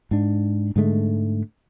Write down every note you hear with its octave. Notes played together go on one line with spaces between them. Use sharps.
G#2 D4
G#2 D3 G#3 A3